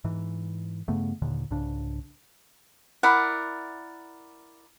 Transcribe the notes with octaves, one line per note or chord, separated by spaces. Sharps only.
G#2 E3
G2 C#3 A3 B3
D#2 A#2 D3 D#3
C2 G#2 C#3 D4
E4 A#4 D5 F#5